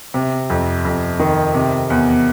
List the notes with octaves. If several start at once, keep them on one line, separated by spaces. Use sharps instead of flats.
C3
F2
F2
D#3
C3
E2